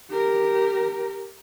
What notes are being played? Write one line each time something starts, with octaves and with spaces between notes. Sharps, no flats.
G4 A#4